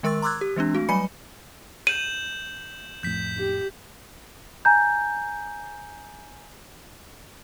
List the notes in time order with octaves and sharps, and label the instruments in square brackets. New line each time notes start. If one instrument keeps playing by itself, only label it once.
[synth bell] D#3 G#3 A#4 C#6 E6 A6
A#5 C6 D6 E6 F#6 G#6
G4
E3 G#3 C4 D4
A3 F#4
F#3 G3 B4 G#5 B5 C#7
[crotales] G6 E7 F#7 [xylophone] D#7
[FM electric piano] F2 A2 [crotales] G6 B6
[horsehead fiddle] G4
[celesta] G#5 A#5 G6